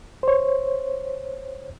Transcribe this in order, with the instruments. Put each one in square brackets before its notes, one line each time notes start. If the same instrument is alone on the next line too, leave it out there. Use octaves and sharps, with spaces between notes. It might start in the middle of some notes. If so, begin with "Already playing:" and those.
[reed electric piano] C5 C#5